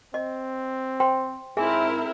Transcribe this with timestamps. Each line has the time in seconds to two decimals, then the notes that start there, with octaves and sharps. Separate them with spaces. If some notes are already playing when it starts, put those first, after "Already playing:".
0.14 C4 D#5
1.00 C5 G5 C6
1.57 G#2 C4 E4 G#4 A#4 E5 G#5